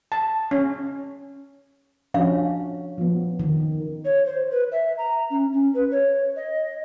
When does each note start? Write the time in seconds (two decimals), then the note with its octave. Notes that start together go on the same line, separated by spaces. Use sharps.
0.12 A5
0.51 C#4
2.14 F3 C#4 D4 F#4 F5
2.98 F3 B3
3.39 D#3
4.05 C#5
4.26 C5
4.51 B4
4.72 E5
4.98 A#5
5.30 C#4
5.53 C#4
5.74 B4
5.91 C#5
6.36 D#5